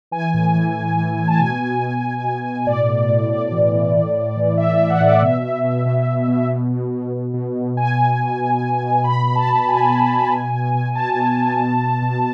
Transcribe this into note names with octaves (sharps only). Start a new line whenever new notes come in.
E3 G#5
A2
E3
E3
E3
A2
A5
B2 G#5
B2
B2
B2
B2
B2
A2 D5
A2
A2
A2 D5
E3
E3
A2
A2
E3
A2 E5
E5
E3
F#5
A2 D5
B2 E5
B2
B2
B2
B2
B2
B2
B2
B2
B2
B2
B2
B2 G#5
B2
B2
B2
B2
B2
B2 B5
B2
A5
B2
B2 G#5
B2
B2
B2
B2
B2
B2 A5
B2
B2
B2
B2
B2